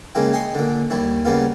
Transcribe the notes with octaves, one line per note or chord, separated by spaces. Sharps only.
C#3 G#3 A#3 E4 G5
D#5 G5 G#5 C6 C#6 D#6
A#2 D3
D#2 G3 E4 C#5
C#3 G3 A#3 B3 F4